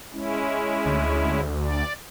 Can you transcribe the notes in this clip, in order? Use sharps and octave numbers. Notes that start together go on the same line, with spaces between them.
G#3 C#4 E4
D2
D5